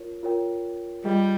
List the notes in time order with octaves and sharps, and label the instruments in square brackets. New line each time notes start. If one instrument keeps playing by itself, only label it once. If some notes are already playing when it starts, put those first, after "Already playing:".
Already playing: [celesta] F4 A#4 C#5
F4 A#4 C#5 G5
[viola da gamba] G3 [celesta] F4 G#4 D#5 G5